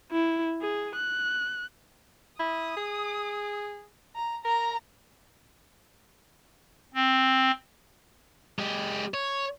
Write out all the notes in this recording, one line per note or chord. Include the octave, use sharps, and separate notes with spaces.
E4
G#4
F#6
E4 D#6
G#4
A#5
A#4 A#5
C4
G#3 G4
C#5